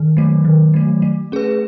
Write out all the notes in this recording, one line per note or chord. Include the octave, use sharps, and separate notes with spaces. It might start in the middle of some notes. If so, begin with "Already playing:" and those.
Already playing: D#3
F#3 A3
D#3
F#3 A3
A3
C#4 G#4 B4